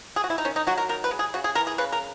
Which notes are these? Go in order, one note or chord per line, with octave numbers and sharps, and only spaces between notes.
G#4
F#4
E4
D#4
D#3 C#4
D#4
F#3 F#4
A#4
D#3 A#4
B4
G#3
G#4
C#3 F#4
G#4
E3 A#4
G#4
C#3 B4
A#4